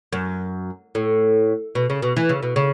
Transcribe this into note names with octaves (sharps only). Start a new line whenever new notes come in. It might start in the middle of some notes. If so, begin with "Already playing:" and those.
F#2
A2
B2
C#3
B2
E3
C#3
B2
C#3